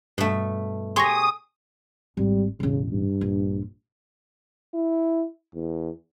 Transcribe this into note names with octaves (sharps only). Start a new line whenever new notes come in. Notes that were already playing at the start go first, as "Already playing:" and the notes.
G2 B2 A3
G4 G#4 C#5 C6 C#6 D#6 A#6
G#1 G3
E1 A1 C#3
G2
A#1
E4
E2